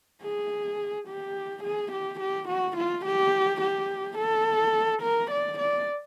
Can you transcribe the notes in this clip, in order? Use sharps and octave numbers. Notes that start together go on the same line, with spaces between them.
G#4
G4
G#4
G4
G4
F#4
F4
G4
G4
A4
A#4
D5
D5